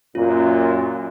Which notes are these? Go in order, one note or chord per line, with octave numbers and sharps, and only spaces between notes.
F#2 A#2 F4